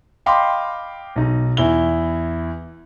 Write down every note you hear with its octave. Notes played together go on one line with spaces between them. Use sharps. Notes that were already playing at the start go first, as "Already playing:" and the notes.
D#5 F5 G5 B5 C6 D6
B1 D#4
E2 E4 G7